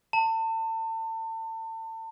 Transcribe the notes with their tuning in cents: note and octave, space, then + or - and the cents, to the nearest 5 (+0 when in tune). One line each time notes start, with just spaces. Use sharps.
A5 +35